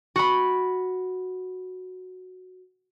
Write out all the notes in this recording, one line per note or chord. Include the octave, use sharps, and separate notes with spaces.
F#4 B5